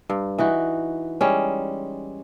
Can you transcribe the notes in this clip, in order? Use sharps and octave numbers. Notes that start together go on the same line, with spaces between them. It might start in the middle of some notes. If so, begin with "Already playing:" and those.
G2
E3 D#4 F#4
G3 G#3 C#4